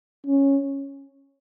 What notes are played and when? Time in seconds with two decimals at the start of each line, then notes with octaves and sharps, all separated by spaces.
0.26 C#4